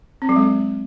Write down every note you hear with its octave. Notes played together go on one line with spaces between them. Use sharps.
C4
F#3
G#3